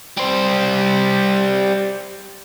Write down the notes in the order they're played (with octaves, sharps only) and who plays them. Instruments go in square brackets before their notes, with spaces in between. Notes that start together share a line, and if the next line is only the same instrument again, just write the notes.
[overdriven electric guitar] G3 C5